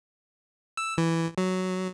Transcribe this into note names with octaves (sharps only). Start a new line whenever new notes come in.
E6
E3
F#3